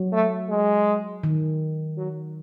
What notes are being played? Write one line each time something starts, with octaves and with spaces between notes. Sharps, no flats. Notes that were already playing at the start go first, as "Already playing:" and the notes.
Already playing: F#3
A3
G#3
D#3
F#3